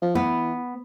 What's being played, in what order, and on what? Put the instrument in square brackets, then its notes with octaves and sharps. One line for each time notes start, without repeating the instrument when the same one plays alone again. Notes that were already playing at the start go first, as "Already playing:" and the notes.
[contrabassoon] F3
[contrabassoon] E3 [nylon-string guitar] B3